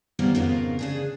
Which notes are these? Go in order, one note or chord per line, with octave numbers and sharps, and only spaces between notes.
B2 D#3 E3 G3 A#3 C4
F2 G#2 C#3 B3 F4 A#4
C#3 D4 G#4